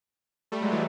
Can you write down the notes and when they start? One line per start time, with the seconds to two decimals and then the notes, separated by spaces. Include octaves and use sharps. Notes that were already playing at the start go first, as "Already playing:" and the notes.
0.52 G3 A3
0.62 F#3 G#3
0.72 E3 F#3